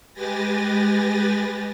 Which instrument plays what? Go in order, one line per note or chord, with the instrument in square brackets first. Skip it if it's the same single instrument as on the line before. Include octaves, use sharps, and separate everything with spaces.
[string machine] G#3 G4 B4 G#5 A6 A#6